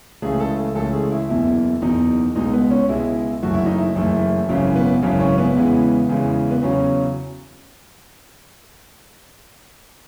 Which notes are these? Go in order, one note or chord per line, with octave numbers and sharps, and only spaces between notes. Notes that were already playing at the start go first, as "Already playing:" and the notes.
C#2 C#3 E3 A3 G#4
A4
C#2 C#3 E3 A3 A4
G#4
E4
F#1 E2 B2 E4
F#1 E2 B2 D#4
C#2 B2 G#3 D#4
B3
C#4
C#2 B2 G#3 E4
F#1 F#2 E3 A3 F#4
E4
D#4
E4
F#1 F#2 E3 A3 E4
G#1 F#2 C#3 E3 C#4
B3
G#1 F#2 C#3 E3
C#4
B3
E2 C#3 E3 G#3
E2 C#3 E3 G#3
B3
E2 C#3 F#3 C#4